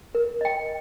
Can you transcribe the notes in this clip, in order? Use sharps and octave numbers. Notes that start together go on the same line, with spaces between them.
A#4
D#5 G5